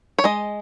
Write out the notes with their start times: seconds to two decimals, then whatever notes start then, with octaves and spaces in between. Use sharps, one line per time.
0.19 C#5
0.24 G#3 D#5